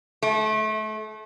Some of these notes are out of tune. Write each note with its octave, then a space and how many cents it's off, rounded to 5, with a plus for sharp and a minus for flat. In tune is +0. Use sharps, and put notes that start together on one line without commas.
A3 -30